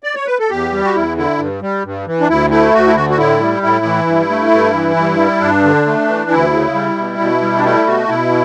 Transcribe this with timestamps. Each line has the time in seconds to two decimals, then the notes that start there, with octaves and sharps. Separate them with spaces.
0.03 D5
0.15 C#5
0.26 B4
0.39 A4
0.50 E2 G4
0.72 G3
0.84 F#4
0.95 E2 E4
1.17 D3 E4
1.39 G2
1.62 G3
1.84 G2
2.07 E3
2.20 D4
2.28 D2 E4
2.50 A3 E4
2.74 D2 F#4
2.87 E4
2.96 D3 F#4
3.10 F#4
3.18 A2 E4
3.41 G3
3.63 A2 E4
3.85 E3
4.07 G2
4.30 A3
4.51 G2
4.74 E3
4.96 G2
5.18 G3
5.41 G2 D4
5.64 D3
5.86 A3
6.08 E3
6.30 D2 E4
6.53 C#3
6.74 G3
6.97 B2
7.19 B2
7.42 G3
7.58 D4
7.64 A3 E4
7.86 B2 F#4
8.09 B2 E4